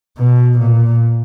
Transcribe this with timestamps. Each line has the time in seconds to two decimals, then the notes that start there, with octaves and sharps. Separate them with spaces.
0.19 B2
0.58 A#2